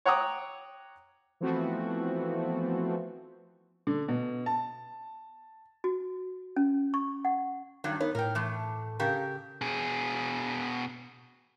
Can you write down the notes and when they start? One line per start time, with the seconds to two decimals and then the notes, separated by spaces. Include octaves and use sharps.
0.05 C#5 F#5 G5 A#5 D6 D#6
1.40 E3 F3 A3 B3 C4 F#4
3.87 D3
4.08 B2
4.46 A5
5.84 F#4
6.56 C#4
6.94 C#6
7.25 F#5
7.84 G2 D#3 F#3
8.00 B3 D#4 A#4 C#5
8.15 A2 A#4 G5
8.35 E3 A3
8.99 C#3 G4 A#4
9.61 B2 G#4